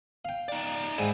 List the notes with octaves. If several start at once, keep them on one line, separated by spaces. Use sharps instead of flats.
F5 G5
D#4 D5
G#2 E4 G5 G#5